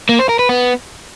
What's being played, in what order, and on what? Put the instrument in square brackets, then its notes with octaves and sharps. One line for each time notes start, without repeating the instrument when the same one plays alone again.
[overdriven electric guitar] A#3
C5
A#4
B4
B3